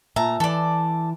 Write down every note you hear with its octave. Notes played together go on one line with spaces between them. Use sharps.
A#2 E5 A5 A#5
E3 A4 D5 A5